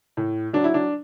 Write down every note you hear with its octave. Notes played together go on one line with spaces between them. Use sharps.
A2
F#3 D4
E4
D4